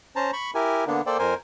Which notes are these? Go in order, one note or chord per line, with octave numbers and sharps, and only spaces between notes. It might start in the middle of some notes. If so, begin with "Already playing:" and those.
C#4 C5 A5 A#5
B5 C#6
E4 G4 A#4 G#5
D3 A#3 B3 D4
A#3 A4 C5 D5 G5
F2 A#4 C5 G#5